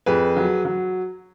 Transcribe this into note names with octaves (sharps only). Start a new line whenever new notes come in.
F2 G#4 B4
F#3
F#3